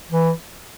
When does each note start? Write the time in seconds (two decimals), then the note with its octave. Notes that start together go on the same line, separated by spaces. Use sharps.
0.11 E3